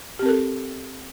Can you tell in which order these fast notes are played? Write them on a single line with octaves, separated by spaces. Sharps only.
G4 C4 A#4 A4